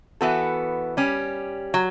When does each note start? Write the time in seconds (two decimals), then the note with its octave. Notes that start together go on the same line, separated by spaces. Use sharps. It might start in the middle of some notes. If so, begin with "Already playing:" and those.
0.21 E3 B3 F#4 A4
0.97 G3 C#4 G4
1.74 F#3